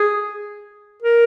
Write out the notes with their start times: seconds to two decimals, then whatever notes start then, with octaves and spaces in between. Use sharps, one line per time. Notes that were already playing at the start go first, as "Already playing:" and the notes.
Already playing: G#4
1.02 A#4